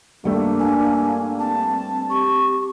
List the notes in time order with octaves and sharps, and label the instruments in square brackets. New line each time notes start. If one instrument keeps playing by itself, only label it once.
[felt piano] G2 G3 A3 [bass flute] A#3 [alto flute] D4
[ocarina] G#5
[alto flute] C4 [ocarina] A5
[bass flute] G4 [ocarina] C#6